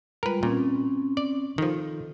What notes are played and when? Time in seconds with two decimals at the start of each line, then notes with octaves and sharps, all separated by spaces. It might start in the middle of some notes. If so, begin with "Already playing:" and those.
0.23 G3 G#3 F4 A#4 B4
0.43 A#2 C4 C#4
1.17 D5
1.58 D#3 F3 A4